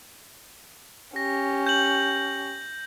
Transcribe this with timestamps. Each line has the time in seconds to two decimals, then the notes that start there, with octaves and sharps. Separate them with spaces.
1.16 C#4 G4 A#6
1.66 G6 F#7